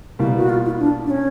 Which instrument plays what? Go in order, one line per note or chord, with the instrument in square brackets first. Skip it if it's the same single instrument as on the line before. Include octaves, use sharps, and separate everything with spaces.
[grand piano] B2 G3 A#3 [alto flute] E4
[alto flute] F#4
F4
E4
D4
D4
C#4